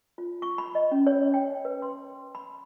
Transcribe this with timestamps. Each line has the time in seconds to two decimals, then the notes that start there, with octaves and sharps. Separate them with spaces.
0.18 F4
0.42 C#6
0.58 B5
0.75 D#5
0.91 C#4
1.07 C#5
1.34 G5
1.65 B4
1.82 C6
2.35 B5